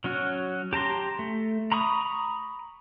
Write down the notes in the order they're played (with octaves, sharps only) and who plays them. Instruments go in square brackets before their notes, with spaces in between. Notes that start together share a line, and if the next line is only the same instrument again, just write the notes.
[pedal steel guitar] F#3 C#4 F#4
G4 A5 A#5 C6
A3
A#5 B5 C#6 D#6